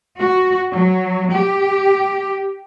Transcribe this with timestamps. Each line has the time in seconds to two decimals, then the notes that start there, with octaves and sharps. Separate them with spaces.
0.20 F#4
0.73 F#3
1.32 G4